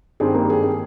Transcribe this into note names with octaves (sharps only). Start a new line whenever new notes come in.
G#1 G2 D#3 G3 C4 G#4
A#3 A#4
G#4
G#4